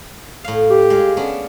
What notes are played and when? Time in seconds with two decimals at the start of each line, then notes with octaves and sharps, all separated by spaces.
0.44 A2 F5
0.71 G4
0.90 G#3 F5
1.17 B3 C#4 D4